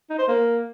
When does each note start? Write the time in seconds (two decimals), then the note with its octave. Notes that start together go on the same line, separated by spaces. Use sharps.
0.10 D#4
0.19 C5
0.28 A#3